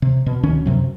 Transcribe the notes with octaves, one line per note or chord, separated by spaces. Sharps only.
C3
B2
D2 D#3 C#4
F#2 C3 F#3